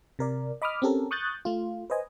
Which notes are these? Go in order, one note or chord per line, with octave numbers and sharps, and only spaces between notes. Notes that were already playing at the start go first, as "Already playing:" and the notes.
C3 A#4 D5
D#5 B5 D6 D#6 F6
C4 C#4 G4 A4 A#4
C#6 D#6 F#6 G6 A6
A3 F4
B4 C5 D#5 G#5